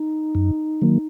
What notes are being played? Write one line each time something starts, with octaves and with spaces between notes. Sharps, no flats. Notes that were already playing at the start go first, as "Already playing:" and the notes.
Already playing: D#4
F#2
D#3 F#3 A#3